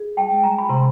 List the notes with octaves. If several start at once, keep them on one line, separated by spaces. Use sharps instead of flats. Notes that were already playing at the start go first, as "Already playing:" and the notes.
Already playing: G#4
G5 A5
G#3
G#5 A#5
B5
C3 A#5 C6